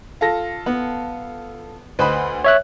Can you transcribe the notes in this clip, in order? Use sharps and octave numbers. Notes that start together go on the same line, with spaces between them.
F4 A4 A#6
B3
D2 B4 C5 D#5 B5
C#5 E5 F#6